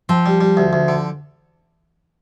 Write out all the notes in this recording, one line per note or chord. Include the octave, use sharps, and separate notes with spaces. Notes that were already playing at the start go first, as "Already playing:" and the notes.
F3 C4
G3
G3
D2
D2
D3